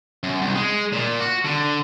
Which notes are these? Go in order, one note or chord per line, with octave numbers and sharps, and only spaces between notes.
F#2
C2
G#3
A#2
F#4
D3